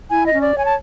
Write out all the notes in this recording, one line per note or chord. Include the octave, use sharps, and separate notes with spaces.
E4 G#5
D#5
C#4
D5
C#5 G#5
A5